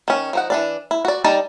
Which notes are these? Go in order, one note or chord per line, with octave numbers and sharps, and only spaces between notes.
D#3 C#4
F3 D#4 F#5
E3 D4 D5
E4
F#4 D5
G3 D#4 D5 A5